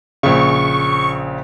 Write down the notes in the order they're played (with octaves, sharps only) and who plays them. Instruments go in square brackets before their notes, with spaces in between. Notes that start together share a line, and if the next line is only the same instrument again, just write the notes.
[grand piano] A#1 C#3 [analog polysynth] C#6